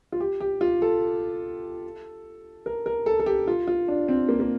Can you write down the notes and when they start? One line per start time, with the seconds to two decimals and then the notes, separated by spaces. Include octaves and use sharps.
0.12 F4
0.20 G4
0.40 G4
0.61 F4
0.82 A4
2.66 A#4
2.86 A#4
3.06 A4
3.20 A4
3.26 G4
3.48 F4
3.67 F4
3.88 D4
4.08 C4
4.29 A#3
4.40 A#3